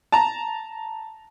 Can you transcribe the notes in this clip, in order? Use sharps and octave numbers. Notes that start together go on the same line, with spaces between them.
A5 A#5